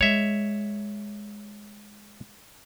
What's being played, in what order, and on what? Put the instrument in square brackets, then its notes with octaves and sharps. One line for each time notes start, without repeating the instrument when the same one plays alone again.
[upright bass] G#3 [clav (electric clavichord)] C#5 E5